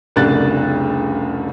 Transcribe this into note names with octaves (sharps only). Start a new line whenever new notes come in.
F1 C2 C#3 D4 F#6 A6